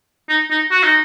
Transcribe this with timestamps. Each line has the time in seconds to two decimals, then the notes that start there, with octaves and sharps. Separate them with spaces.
0.29 D#4
0.50 D#4
0.71 F#4
0.83 D#4